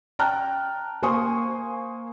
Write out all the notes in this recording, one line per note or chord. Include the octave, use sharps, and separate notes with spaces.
G5 A5 A#5 F6 F#6
A#3 C5 G#5 C6 C#6 D#6